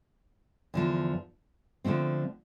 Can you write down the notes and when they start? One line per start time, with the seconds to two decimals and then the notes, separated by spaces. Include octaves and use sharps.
0.74 E2 D3 F3
1.84 D3 F3 A3 C4